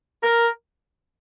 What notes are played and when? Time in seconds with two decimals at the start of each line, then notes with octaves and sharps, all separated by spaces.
0.23 A#4